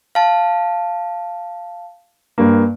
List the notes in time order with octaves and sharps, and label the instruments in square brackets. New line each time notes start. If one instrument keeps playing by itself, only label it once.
[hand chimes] F5 A5
[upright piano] G2 A#3